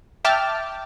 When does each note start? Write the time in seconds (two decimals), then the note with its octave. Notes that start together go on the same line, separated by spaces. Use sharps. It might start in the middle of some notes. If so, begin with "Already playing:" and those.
0.25 E5 G5 A5 D6 F6